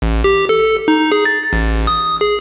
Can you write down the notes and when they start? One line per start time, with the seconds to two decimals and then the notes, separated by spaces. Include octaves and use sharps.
0.02 A1
0.24 G4
0.49 A4
0.88 D#4
1.12 G#4
1.25 A6
1.53 A1
1.87 D#6
2.21 G#4